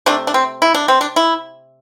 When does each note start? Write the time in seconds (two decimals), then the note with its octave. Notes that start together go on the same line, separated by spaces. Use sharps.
0.06 C3 A3 D4
0.27 D4
0.34 C4
0.62 E4
0.74 D4
0.88 C4
1.01 D4
1.16 E4